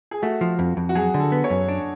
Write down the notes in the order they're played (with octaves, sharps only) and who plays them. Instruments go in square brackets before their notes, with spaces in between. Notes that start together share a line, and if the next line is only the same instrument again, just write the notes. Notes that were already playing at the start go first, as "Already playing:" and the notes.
[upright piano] G#4
[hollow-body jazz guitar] A3 [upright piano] F#4
[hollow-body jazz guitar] F3
F2
F2
[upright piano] F#4
[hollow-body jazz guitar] F#3 [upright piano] G#4
[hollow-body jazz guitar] D3
[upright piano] A4
[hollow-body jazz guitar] B3
[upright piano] C#5
[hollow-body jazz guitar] F#2
D4